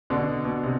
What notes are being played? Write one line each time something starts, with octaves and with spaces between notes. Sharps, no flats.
B2 D3
B2
C3